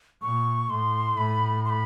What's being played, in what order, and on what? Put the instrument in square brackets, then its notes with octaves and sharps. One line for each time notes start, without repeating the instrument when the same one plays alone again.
[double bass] A#2 [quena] C#6
[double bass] A2 [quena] C6
[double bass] A2 [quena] B5
[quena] C6
B5